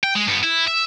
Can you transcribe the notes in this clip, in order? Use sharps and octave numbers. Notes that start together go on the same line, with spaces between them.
G5
G#3
G2 B3
E4
E5